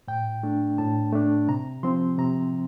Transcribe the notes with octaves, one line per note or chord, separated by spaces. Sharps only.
A2 G5
A3 D4
A2 A5
A3 D4
C3 A#5
F3 C4 C6
C3 A#5